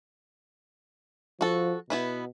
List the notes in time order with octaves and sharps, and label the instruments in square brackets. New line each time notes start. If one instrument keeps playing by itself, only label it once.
[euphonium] F3 [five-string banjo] F#4 A4
[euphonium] B2 [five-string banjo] B3 E4 B4